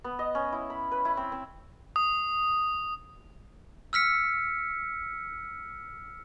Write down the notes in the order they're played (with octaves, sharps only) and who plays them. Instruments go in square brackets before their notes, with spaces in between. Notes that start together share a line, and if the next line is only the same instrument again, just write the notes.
[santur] B3
D#5
C#4
E4
B5
B4
E4
C4
C4
[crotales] D#6
[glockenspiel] E6 F6 B6 C#7